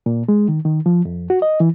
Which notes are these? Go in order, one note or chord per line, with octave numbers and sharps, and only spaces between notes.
A#2
G#3
D#3
D#3
F3
F2
F#4
D#5
E3